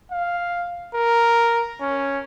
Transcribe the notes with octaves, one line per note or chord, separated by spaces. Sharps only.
F5
A#4
C#4